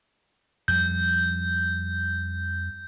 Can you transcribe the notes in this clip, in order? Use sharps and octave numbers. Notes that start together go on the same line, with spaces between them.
F2 G3 G6